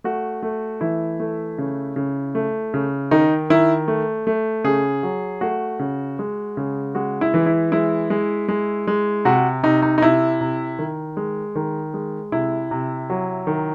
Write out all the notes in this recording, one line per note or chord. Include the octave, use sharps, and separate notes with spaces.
A3 F#4
A3
E3 E4
A3
C#3
C#3
A3
C#3
D#3 D#4
D#3 E4
A3
A3
C#3 G#4
F#3
A3 F#4
C#3
G#3
C#3
G#3 F#4
E4
E3
E4
G#3 E4
G#3
G#3
G#3
C3 F#4
C3 D#4
D#4
D#4
C3 E4
C3
D#3
G#3
D#3
G#3
C3 E4
C3
F#3
D#3